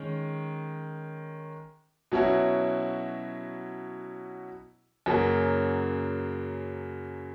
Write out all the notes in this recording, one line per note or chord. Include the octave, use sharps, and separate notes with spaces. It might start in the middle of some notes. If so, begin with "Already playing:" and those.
Already playing: D#3 G#3 C#4
B2 F#3 C#4 E4
F#2 C#3 F#3 A#3